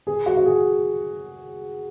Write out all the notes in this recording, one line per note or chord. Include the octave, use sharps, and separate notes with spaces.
G#4
F#4
F#4
G#4